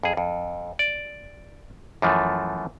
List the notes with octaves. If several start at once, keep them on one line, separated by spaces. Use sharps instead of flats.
F2 G#4
F2
D5
F#2 E3 F3 A3